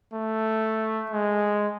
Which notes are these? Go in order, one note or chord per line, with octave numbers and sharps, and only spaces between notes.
A3
G#3